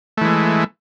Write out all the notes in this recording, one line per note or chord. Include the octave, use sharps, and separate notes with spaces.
E3 G#3 A3